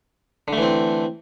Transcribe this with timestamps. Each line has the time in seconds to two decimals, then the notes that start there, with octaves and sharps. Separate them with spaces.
0.48 D3
0.53 A3
0.57 E3
0.62 C4